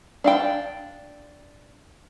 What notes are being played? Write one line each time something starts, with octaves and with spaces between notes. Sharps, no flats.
D4 F5 G5